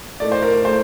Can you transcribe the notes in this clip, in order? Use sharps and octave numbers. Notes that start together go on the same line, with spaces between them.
A2 A3 D#4 D5
C5
A#4
A2 A3 C5